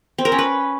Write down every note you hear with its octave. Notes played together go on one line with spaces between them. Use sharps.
C4
A#4
C#4
B4